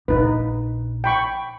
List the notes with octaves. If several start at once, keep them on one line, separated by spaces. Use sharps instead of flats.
A#1 D#4 B4
G5 B5 C#6